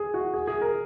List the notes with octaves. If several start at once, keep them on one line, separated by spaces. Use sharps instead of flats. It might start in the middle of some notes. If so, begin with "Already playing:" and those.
Already playing: G#4
F#4
G#4
G#4
A#4